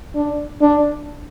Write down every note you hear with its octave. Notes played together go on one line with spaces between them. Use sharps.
D4
D4